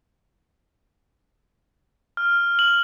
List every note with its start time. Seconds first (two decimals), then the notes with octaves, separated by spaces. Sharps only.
2.17 F6
2.59 F#7